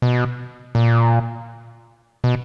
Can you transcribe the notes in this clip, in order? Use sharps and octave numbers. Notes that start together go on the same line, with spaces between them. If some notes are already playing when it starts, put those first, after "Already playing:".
B2
A#2
B2